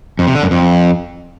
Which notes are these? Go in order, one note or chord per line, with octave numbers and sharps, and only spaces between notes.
F2
C3
D3
F#2
F2